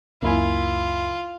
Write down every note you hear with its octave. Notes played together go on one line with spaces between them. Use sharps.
C#2 F#2 A#3 E4 F4 G#5